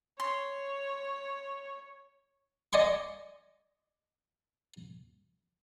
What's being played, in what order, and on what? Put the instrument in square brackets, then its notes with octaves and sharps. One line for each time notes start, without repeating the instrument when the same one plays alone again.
[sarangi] C#5 [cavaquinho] C6
[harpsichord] D5 D#5 G#5 C6 C#6